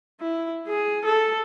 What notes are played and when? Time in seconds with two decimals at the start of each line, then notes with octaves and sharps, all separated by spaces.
0.21 E4
0.68 G#4
1.05 A4